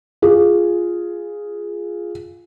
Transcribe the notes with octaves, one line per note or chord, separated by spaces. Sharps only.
F4 G#4